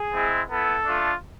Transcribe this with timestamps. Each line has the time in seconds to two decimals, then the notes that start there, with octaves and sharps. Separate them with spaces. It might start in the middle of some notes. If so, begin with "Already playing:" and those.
Already playing: G#4
0.14 G#3 C4 E4
0.50 B3 E4 A4
0.84 A3 D4 F4